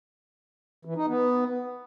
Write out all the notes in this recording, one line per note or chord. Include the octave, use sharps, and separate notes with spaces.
E3
D#4
B3